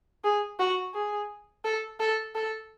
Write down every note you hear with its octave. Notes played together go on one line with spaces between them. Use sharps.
G#4
F#4
G#4
A4
A4
A4